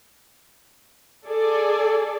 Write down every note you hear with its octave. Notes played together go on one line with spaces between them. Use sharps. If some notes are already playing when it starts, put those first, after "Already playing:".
G#4 A4 D5